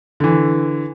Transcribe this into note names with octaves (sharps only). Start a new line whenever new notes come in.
D3 E3